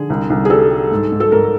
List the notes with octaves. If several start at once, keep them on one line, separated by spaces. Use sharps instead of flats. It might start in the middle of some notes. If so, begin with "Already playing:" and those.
Already playing: D3 G#4
C2
C2
G#4
G3 A4
G3
G#2
G#2
A4
G#2 A#4